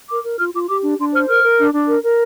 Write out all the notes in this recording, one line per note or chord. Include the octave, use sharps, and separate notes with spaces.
A#4 D6
A#4
F4 F6
F4 D6
G4 D6
D4
D4 C6
C5 F6
A#4 F6
A#4
D4
D4
A#4
A#4